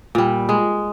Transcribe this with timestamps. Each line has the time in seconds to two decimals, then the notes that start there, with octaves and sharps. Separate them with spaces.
0.15 A#2 G3
0.49 G#3